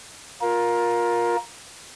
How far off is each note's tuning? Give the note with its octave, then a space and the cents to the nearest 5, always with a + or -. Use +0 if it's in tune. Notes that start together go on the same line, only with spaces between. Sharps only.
F4 +20 A#4 +15